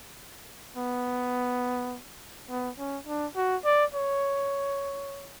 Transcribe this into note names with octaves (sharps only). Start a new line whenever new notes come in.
B3
B3
C#4
D4
F#4
D5
C#5